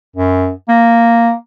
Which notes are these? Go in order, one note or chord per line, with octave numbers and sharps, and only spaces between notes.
F#2
A#3